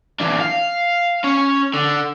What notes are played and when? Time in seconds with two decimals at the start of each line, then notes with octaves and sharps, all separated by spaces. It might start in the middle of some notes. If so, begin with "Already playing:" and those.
0.20 E3 D4
0.41 F5
1.24 C#4
1.74 D3